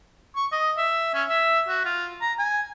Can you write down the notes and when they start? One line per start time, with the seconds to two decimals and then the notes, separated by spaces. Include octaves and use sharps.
0.36 C#6
0.52 D#5
0.78 E5
1.14 C#4
1.29 E5
1.68 F#4
1.85 F4
2.22 A#5
2.39 G#5